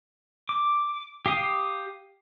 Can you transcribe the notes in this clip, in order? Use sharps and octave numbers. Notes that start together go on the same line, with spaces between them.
D6
G4 F5 D#6